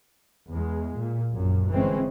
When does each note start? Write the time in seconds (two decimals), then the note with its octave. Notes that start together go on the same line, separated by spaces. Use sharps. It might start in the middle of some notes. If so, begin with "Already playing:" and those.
0.49 E2 G#3
0.95 A#2
1.32 A#1 F#2
1.69 G1 E3 G#3 C4 C#4